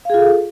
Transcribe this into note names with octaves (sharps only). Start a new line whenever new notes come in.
F4 G#4 A4 F5